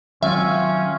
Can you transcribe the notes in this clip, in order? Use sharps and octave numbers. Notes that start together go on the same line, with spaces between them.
D#3 F#3 G#3 C4 C#4 F4 E5